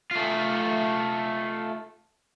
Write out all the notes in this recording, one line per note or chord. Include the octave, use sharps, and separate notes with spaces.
A3 F4